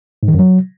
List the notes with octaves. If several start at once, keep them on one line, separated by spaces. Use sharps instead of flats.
G#2
D#3
F#2
F#3